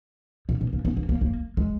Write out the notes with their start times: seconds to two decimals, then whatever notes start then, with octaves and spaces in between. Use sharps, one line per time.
0.49 A#2
0.61 B2
0.73 A#3
0.85 B3
0.97 A#3
1.09 A#3
1.21 A#3
1.57 G#3